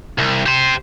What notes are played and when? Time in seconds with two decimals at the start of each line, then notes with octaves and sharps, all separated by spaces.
0.19 C2
0.46 G4 C5